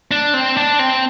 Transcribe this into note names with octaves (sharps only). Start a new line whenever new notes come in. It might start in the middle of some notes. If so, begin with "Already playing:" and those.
D4
C4
D4
C4